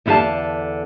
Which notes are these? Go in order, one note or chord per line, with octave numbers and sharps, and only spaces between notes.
E2 D3 E4 G4 F5 A5